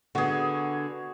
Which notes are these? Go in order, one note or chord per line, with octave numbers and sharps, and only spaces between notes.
D3 B3 F#4 G#4